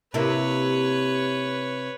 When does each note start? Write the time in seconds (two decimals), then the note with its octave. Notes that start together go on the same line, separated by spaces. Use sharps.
0.14 C3 A#3 E4 B4 C#5